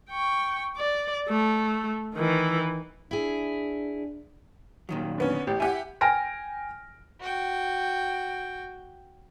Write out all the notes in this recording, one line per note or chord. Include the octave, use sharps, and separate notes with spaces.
G5 C#6
D5
A3
D#3 E3
D4 E4 G#4
A#2 D#3 F#3
D3 B3 C#4
A1 G4
E4 G4 F#5 G#5
G5 G#5 F6 A#6 D7
F#4 G5